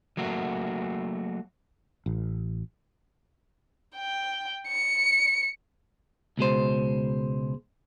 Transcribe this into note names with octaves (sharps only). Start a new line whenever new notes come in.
F#3 A3 A#3 F#4
A1
G5
C#7
C#2 B2 G#3 C5